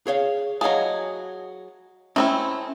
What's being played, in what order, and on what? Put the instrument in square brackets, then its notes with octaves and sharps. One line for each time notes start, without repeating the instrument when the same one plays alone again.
[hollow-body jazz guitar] G#4 C#5 F5
[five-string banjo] F#3 G#4 [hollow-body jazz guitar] D#5 F5 A5
[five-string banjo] A3 C4 E4 [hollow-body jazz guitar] C#4